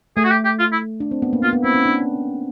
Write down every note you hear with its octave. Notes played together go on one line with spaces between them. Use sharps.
A3 G#4
F#4
G4
G4
F4
E4
D4
C4
B3
A#3
B3 F4
B3
C4 E4
C#4
D4